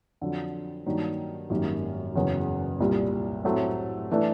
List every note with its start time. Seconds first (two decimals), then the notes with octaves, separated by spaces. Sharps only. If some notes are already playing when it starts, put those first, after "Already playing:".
0.21 F2 D3 F#3
0.86 G2 D#3 F#3 A#3 D4
1.50 G#1 F#2 D#3 G3 A#3
2.15 F#1 E2 C#3 F#3
2.80 C2 A#2 G3
3.44 A2 F#3 A3 C4
4.11 E3 A3 D4